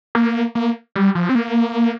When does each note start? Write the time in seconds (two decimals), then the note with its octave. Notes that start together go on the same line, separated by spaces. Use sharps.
0.15 A#3
0.55 A#3
0.96 G3
1.15 F3
1.29 C4
1.35 A#3